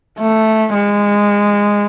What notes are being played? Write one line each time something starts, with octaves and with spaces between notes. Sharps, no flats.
A3
G#3